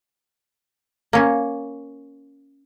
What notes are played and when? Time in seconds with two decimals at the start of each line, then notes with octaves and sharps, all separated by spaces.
1.13 A#3 C#4